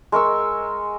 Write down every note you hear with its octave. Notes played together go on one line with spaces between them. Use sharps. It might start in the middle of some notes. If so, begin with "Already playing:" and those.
G#3 A#4 C#6 E6